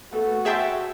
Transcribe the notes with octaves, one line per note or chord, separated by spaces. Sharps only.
A3 B3 F#4 A4
G#4 C#5 E5 G5 A5 C6